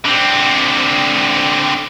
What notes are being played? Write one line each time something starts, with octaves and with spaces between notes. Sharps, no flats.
D3 C4